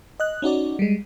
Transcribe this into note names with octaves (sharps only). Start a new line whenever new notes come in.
D#5 F#6
C#4 D#4 F#4 D5
G3 G#3